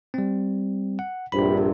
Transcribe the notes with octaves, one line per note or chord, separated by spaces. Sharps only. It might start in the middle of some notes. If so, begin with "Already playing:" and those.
G3 C4
F#5
A#1 G2 C3 B5